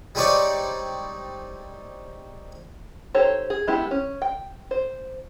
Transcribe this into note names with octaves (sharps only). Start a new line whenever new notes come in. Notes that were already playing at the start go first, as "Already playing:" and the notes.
G3 G#3 C4 D#4 C#5 D5
D#4 G4 A4 C5 C#5
G#4
G#3 B3 E4 G4
C#4
G5
C5